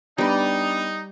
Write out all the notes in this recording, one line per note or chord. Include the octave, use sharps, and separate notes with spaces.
G3 B3 D4 D#4 D5 B5